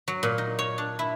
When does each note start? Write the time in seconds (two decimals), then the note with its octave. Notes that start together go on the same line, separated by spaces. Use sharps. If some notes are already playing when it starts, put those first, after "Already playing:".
0.08 F#3
0.23 A#2
0.38 D#4
0.59 C#5
0.78 D4
0.99 E4